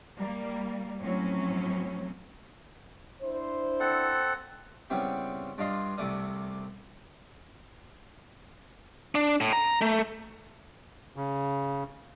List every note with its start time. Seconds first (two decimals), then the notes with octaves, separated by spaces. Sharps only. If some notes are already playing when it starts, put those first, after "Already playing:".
0.19 G3 A#3
1.01 A2 F3 F#3 C4 C#4
3.21 D4 E4 C5
3.80 C4 A4 F#5
4.90 C#3 G3 B3 C4 E4 G4
5.58 G2 D4 F4 D#5 C6
5.98 C2 C3 A3 A4 D5 D#6
9.15 D4
9.41 A2
9.53 A#5
9.82 A3
11.16 C#3